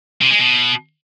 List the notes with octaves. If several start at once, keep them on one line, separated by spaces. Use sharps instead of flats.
C3
G#3
B2